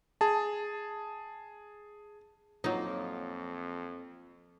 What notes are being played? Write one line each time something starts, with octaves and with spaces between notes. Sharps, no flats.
G#4 A5
F2 F#3 A#3 D#4 F4 D#5